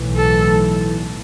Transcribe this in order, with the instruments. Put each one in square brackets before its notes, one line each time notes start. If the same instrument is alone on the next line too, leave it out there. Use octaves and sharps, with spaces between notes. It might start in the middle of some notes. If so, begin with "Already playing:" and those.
Already playing: [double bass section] B1 A2 E3
[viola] A4